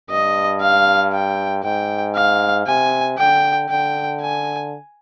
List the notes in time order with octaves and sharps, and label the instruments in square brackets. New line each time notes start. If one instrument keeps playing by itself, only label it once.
[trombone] G2 [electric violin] D#5
[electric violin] F5
G5
[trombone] G#2 [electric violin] G5
[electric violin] F5
[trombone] C3 [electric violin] G#5
[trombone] D3 [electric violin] G5
[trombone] D3 [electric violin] G5
[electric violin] G#5